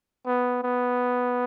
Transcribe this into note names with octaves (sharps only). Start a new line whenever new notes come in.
B3
B3